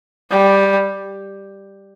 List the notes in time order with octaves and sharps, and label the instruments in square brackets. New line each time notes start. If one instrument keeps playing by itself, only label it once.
[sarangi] G3